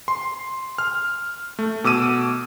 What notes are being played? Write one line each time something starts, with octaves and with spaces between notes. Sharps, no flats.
C6
F6
A3
B2 D6 E6 D#7